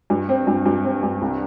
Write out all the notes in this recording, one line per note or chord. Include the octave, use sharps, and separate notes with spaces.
G2
C4
G2
G2
C4
G2
C2